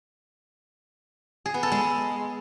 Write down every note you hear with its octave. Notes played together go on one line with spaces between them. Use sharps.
G#4
B3
A4
G#3